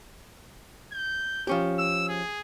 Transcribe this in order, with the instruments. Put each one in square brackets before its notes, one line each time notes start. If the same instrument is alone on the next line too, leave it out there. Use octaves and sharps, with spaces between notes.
[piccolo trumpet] G6
[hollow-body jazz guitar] F3 C#4 G4
[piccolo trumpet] E6
G#4